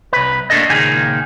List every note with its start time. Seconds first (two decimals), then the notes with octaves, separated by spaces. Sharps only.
0.13 C2 B4
0.50 A3 A#3 D4 A4 D#5
0.69 C#2 A#2 D#3 A#3 G#4